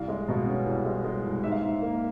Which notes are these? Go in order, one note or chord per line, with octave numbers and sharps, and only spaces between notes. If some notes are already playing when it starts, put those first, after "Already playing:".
Already playing: C2 F5
G#3
B2
C#4
C2
G#3
G#3
C2
G#2 E5
F5
G#2 E5
A#3